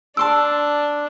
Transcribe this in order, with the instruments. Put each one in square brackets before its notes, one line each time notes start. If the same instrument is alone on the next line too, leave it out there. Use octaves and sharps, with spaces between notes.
[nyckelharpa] D4 [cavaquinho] A5 C6 D6 [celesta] E6